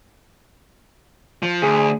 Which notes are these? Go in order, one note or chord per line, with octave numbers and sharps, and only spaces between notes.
F3
D2 G#4